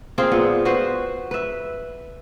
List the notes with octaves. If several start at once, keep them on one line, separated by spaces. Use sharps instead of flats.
A#3 C4 F4 G#4
A#2 B3
F#4 B4 C5
B4 E5